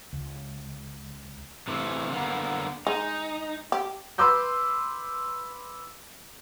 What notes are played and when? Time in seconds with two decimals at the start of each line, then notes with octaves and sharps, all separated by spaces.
0.13 C#2
1.68 C3 E3 A3
2.12 D3 A#3 B3
2.87 G#3 D#4
3.72 G4
4.18 B4 C6 D6 E6 G6